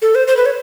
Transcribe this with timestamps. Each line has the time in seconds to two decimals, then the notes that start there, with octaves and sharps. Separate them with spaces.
0.02 A4
0.15 C5
0.28 C5
0.37 B4
0.46 C#5